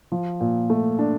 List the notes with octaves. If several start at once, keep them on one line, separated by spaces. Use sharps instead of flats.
F3
A#2
A3
D4